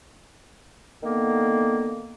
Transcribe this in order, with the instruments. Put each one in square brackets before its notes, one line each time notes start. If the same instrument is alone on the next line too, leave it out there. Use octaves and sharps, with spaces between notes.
[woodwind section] D3 D#3 A#3 B3